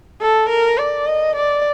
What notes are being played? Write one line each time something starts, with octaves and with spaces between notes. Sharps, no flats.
A4
A#4
D5
D#5
D5